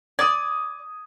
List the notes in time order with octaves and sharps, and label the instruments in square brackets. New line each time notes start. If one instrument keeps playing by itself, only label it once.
[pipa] D5 [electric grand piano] D#6 G#6